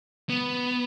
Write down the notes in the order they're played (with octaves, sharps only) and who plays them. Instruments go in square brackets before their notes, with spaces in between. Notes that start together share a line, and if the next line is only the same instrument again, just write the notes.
[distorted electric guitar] B3